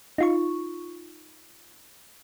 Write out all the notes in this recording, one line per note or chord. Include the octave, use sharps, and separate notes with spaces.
D#4 F4 C#6